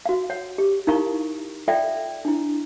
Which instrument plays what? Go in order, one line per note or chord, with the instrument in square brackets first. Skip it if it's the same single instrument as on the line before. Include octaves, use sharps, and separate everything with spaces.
[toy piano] F#4 F5
C#5 F#5
G4
D#4 E4 A#4 F5 A#5 C#6
F4 A4 D5 E5 F5 G5
D4 E4